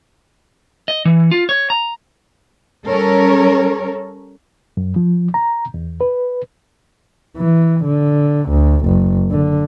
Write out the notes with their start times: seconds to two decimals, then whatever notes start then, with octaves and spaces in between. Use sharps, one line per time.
0.88 D#5
1.05 E3
1.31 F4
1.49 C#5
1.70 A#5
2.87 G3 C#4 A4 A#4 C#5
4.77 F#2
4.96 F3
5.34 A#5
5.74 E2
6.01 B4
7.37 E3
7.85 D3
8.49 D2
8.86 F#1
9.31 D3